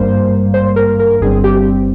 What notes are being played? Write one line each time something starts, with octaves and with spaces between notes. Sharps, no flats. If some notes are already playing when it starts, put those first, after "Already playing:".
Already playing: G#1 G2 G3 A#3 C5
C5
A#4
A#4
G1 G2 G3 C4 G#4
G4